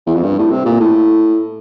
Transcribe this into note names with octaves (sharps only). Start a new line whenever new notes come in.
E2
F2
G2
A2
C3
A#2
A2